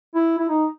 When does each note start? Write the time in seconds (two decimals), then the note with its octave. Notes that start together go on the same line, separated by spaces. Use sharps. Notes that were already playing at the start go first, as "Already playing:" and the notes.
0.15 E4
0.38 E4
0.49 D#4